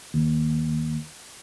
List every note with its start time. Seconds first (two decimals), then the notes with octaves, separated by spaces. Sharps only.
0.14 D#2